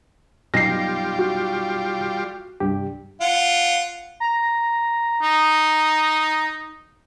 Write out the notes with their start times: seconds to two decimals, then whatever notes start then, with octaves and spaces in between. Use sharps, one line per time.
0.54 F#2 B2 G3 D#4 F4 G4 A#6 C7
1.19 F#4
2.60 C2 G2 G4
3.21 F4 F#5
4.20 A#5
5.22 D#4